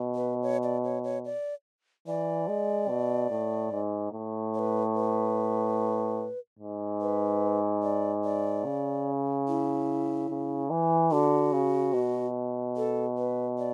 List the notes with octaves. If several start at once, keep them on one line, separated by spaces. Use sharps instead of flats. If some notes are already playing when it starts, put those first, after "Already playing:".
Already playing: B2
B4
C#5
D5
C#5
C#5
D5
E3 D5
G#3
B2
A2
G#2
A2
C#5
B4
B4
G#2
B4
D5
D5
C#3
E4
C#3
E3
D3 F#4
C#3
B2
A4
B4
D5